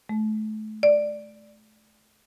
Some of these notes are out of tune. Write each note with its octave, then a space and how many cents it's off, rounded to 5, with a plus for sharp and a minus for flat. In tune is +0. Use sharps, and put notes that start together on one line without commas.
A3 -30
D5 +5